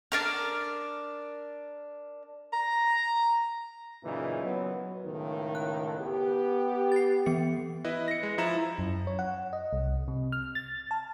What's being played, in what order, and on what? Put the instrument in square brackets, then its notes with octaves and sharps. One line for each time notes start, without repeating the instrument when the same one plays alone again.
[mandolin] D4 A#4 F6
[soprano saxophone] A#5
[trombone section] F#2 A#2 C#3 E3 D#4
F#3 B3
[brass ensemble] C#2 A2 D#3
[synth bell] F#6
[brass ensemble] B3 G4
[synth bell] A6 C7
E3 B3 C#7
[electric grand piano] E4 B4 D#5
A#6 C#7
G#3
F3 E4 A#5 E7
[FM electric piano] F#2
C#5
F#5
D#5
C2
C3
F6
A6
A5